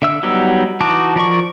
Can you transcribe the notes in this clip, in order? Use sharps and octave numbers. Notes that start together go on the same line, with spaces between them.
D3 E5 E6
F#3 G3 B3 D#4 E6
E3 D#4 F#4 A5 D6
F3 A#4 D5 C#6